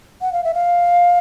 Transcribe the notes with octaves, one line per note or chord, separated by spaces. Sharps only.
F#5
F5
E5
F5